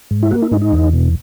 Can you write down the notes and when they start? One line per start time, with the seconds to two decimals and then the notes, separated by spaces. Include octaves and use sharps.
0.11 G#2
0.23 E4
0.31 A#3 F#4
0.42 E4
0.51 G#2 D#4
0.62 D#4
0.73 E2
0.93 B2